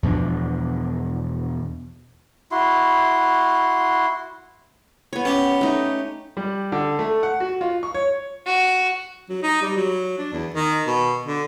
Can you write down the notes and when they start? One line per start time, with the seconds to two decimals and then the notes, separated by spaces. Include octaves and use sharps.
0.03 E2 B2 F3 D4
2.52 E4 F#4 C6
5.13 B3 C#5
5.25 C#4 G4 F#5
5.61 A3 D#4
6.37 G3
6.72 D3
6.99 A3
7.23 F#5
7.40 F#4
7.61 F4
7.83 C#6
7.94 C#5
8.46 F#4
9.29 F#3
9.43 D#4
9.62 G3
9.77 F#3
10.19 D4
10.32 E2
10.54 D#3
10.87 B2
11.26 D3